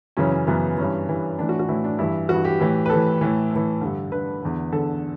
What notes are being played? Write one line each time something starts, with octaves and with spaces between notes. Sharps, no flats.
F#2 C#3 E3 C#4
C#4
F#2 C#3 E3 B3
G2 E3 C#4
G2 E3
A2 E3 D4
F#4
F#4
A2 E3 E4
D4
G2 E3 E4
G2 E3 F#4
G4
A2 E3
B4
A2 E3 A4
A2 E3
A2 E3
G2 D3
G2 D3 B4
E2 D3
E2 D3 A4